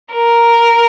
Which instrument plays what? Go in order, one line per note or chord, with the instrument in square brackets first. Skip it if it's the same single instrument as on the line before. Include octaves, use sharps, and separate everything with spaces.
[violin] A#4